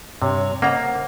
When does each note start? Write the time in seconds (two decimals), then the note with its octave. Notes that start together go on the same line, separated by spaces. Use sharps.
0.22 G2 C3 C#5
0.62 C#3 A#3 A4 C5 D#5 F#5 A#5